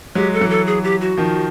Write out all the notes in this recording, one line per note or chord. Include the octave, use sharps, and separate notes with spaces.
F#3 G#3 G4
A4
E3 F#3
A4
G#4
G4
F#4
D#3 F3